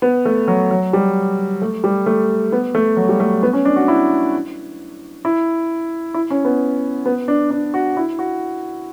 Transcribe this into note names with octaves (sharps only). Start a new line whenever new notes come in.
B3
A3
F#3
F#3
G3
A3
G3
A3
B3
A3
F#3
G3
A3
B3
C#4
D4
F#4
E4
E4
E4
C#4
B3
B3
D4
D4
F#4
E4
F#4